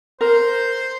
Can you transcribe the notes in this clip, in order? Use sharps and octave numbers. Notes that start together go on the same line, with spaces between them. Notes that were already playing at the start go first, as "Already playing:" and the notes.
A#4 C5